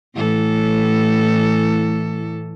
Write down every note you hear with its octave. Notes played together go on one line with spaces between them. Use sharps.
A2 E3 A4